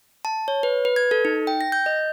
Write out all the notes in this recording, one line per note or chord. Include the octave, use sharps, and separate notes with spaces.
A5
C#5
B4
B4
G#6
A4
D#4
G5
A#6
G6
D#5